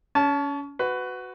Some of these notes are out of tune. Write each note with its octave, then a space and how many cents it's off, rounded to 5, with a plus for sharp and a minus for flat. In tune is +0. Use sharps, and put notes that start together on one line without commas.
C#4 +25 A5 -20
F#4 +0 B4 +20